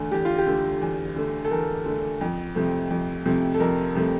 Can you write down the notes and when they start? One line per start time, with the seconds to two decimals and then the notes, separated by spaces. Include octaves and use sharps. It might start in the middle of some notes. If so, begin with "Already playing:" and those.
Already playing: E2 D3 A3
0.11 E2 G4
0.25 F4
0.38 G4
0.46 D3 A3
0.81 E2
1.16 D3 A3
1.45 A4
1.51 E2 A#4
1.86 D3 A3
2.21 F2
2.55 C3 F3 A3
2.90 F2
3.26 C3 F3 A3
3.54 A4
3.60 F2 A#4
3.95 C3 F3 A3